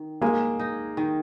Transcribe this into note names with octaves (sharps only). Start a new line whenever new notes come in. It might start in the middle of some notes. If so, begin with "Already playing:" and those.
Already playing: D#3
G#3 A#3
D#4
D#3